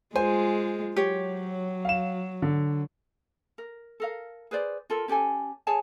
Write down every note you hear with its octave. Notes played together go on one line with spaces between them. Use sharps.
G#3 F4 C5 G#5
F#3 G4 C#5
F5 E7
D3
A#4
A4 A#4 F5
G#4 B4 C5 D5
F4 A4 A#4
C#4 G4 A4 G#5
G#4 C#5 G#5 A5